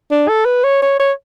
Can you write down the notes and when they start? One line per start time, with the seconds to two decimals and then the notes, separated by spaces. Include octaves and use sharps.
0.11 D4
0.29 A4
0.45 B4
0.64 C#5
0.82 C#5
1.00 C#5